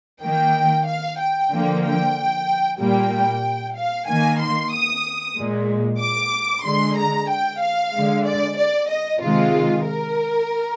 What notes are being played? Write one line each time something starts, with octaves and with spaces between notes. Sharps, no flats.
D#3 A#3 G5
F5
G5
D3 F3 A#3
G5
A#2 G3 A#3 G5
F5
D#3 A#3 G#5
C6
D#6
A#2 G#3
D6
D3 G#3 C6
A#5
G5
F5
D3 G#3
D5
D5
D#5
C3 D#3 G#3 F4
A#4